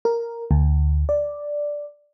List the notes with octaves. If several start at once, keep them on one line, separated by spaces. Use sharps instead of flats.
A#4
D2
D5